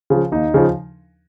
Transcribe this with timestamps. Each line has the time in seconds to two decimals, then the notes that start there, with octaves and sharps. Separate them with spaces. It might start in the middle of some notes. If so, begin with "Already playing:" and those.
0.10 C#3 F3
0.32 D#2 D#4
0.54 C#3 F3